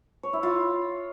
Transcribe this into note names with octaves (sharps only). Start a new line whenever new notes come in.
C#5
E4
F4